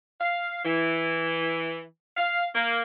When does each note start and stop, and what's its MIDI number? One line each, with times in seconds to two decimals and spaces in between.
0.21 0.61 77
0.65 1.83 52
2.17 2.46 77
2.55 2.81 58